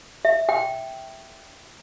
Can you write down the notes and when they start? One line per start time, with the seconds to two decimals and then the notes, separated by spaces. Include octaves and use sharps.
0.25 E5
0.49 G5